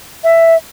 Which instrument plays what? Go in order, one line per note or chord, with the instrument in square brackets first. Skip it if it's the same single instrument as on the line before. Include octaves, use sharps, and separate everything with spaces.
[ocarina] E5